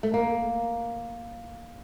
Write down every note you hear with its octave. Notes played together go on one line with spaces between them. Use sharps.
A3
A#3